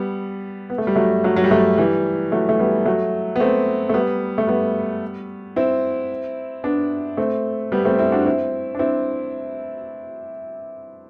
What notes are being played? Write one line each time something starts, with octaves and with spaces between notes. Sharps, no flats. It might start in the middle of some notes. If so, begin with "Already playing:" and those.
Already playing: G3 B3
B3
A3
G3
F#3 A3
F#3 A3
F#3
G3
F#3 A3
E3 G3
F#3 A3
A3
G3 B3
F#3 A3
B3
A3 C4
A3
G3 B3
A3
G3 B3
C4 E4
B3 D4
A3 C4
G3 B3
A3 C4
C4 E4
D4 F#4
C4 E4
D4
C4 E4